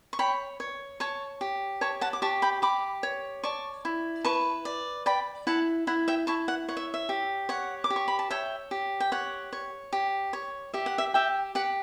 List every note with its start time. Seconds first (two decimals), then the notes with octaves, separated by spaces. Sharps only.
0.13 C#6
0.19 C#5 G5 B5
0.60 C#5
1.00 C#5 A5 C#6
1.41 G4
1.81 C#5 A5 C#6
2.01 F#5 A5
2.13 D6
2.22 G4 A5 C#6
2.42 G5 B5
2.62 G4 B5 D6
3.03 C#5
3.44 D5 A5 C#6
3.85 E4
4.25 B4 A5 C#6
4.65 D5
5.06 D5 G5 B5
5.47 E4 F#5 A5
5.87 E4 F#5
6.08 E5 G5
6.27 E4 A5 C#6
6.48 F#5
6.68 C#5 F#5
6.77 E5
6.94 E5
7.09 G4
7.49 C#5 F#5
7.84 D6
7.90 G4
7.96 C#6
8.08 B5
8.19 A5
8.31 C#5 E5 G5
8.71 G4
9.00 G5
9.12 C#5 F#5
9.53 C#5
9.93 G4
10.33 C#5
10.74 G4 E5
10.86 F#5
10.98 E5
11.14 G4 E5 G5
11.55 G4 F#5